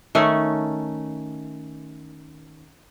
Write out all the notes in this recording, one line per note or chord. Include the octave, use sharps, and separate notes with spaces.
D#3 A3 C#4